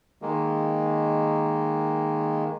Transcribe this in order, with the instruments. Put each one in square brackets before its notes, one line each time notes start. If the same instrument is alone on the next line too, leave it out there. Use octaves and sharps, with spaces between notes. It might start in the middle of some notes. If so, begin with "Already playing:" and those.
[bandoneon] D#3 G#3 A#3